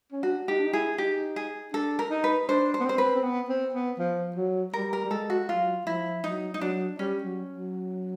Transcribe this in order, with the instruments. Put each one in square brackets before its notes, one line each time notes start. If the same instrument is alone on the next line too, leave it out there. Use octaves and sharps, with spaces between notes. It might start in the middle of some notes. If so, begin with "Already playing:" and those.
[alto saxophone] C#4
[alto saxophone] D4 [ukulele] F#4
[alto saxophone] D#4 [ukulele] G4
[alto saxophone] D4
D#4
[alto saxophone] E4 [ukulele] G#4
[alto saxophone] D#4 [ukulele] G4
[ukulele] G#4
[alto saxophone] D4 [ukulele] A4
[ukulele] A#4
[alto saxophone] D#4
[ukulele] B4
[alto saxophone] D4 [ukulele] C5
[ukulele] C5
[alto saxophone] B3
[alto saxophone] C4 [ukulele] C5
[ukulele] B4
[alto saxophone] C4
B3
C4
B3
F3
F#3
[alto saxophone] G3 [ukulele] A#4
[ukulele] A#4
[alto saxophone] G3
[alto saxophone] G#3 [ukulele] A4
[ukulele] F#4
[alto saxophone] F#3 [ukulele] F4
[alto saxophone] F3 [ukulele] E4
[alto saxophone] F#3 [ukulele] D#4
[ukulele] D#4
[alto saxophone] F#3 [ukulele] D4
[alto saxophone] G3 [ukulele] C#4
[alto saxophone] F#3
F#3